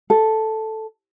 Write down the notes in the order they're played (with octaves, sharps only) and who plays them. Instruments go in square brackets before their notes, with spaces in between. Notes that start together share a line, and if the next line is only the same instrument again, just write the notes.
[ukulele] A4